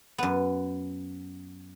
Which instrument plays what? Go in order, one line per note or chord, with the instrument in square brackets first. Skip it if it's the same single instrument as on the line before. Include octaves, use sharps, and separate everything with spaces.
[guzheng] F#2 B3